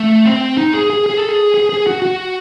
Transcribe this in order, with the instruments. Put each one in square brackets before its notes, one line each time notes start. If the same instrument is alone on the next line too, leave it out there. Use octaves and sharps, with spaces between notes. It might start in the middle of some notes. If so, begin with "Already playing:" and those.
Already playing: [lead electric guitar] A3
C4
D#4
G#4
G#4
G#4
A4
G#4
G#4
G#4
F#4
F#4